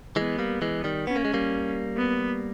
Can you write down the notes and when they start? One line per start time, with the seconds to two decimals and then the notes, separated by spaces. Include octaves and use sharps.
0.16 E3 G#3 B3
0.39 G3 A#3
0.62 E3 G#3
0.84 D#3 G3
1.07 B3 C#4
1.16 A#3
1.25 G#3
1.34 G3 A#3
1.97 B3